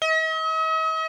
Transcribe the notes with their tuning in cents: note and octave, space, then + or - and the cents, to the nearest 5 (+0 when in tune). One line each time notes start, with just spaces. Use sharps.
D#5 +45